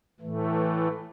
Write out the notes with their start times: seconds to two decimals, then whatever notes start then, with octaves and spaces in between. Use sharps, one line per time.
0.20 A2 E3 A3